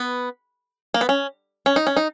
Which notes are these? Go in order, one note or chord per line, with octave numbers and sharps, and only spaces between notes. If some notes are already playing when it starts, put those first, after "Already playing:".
Already playing: B3
A#3
B3
C#4
C#4
D#4
C#4
D#4